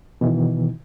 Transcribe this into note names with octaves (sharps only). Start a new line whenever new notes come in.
B2 D#3 E3